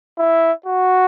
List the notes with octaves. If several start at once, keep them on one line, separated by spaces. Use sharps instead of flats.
E4
F#4